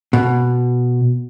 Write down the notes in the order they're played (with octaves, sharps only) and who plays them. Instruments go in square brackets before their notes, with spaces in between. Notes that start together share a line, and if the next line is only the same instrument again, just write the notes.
[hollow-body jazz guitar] B2